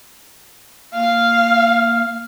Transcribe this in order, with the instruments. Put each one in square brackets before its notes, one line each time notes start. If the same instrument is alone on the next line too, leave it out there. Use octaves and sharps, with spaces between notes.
[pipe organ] A#3 F6 [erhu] F5